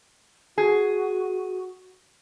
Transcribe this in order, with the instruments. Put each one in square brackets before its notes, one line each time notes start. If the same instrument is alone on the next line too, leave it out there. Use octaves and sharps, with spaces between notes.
[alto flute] F#4 [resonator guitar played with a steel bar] G#4